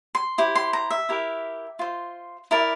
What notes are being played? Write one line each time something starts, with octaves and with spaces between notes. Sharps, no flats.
C6
E4 G4 C5
C6
A#5
E5
E4 G4 A#4
F4 C5
E4 A#4 D5